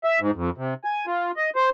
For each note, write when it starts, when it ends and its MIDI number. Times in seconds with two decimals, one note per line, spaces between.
0.04 0.20 76
0.20 0.31 44
0.36 0.50 41
0.57 0.74 48
0.84 1.06 80
1.07 1.31 65
1.37 1.50 75
1.56 1.70 72